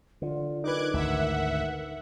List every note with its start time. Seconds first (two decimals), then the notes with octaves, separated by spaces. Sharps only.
0.22 D3 F4
0.64 D#4 A#4 B4 D6 F#6 G#6
0.94 G#1 D2 E5 F#5